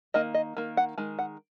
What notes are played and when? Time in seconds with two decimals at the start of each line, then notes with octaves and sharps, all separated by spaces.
0.14 D#3 A#3 D#5
0.34 D#5
0.57 D#3 A#3
0.77 F#5
0.98 D#3 G#3
1.19 F#5